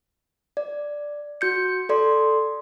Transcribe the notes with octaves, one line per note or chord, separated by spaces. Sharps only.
D5
F#4 G6 C#7
A4 D5 C6